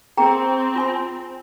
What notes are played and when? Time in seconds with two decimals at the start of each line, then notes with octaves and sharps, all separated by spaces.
0.17 C4 G#4 G5 A#5
0.76 F4 G#5 C6